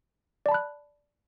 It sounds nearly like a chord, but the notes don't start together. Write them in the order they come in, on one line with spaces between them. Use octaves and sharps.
D5 A5 B5 F#6